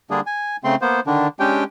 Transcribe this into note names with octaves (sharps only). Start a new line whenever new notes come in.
D3 G3 A#3 D4 G#4
G#5
C#3 A3 C4 C6
A#3 B3 C5
D3 D#3 D4
G#3 C#4 D4 G4 G5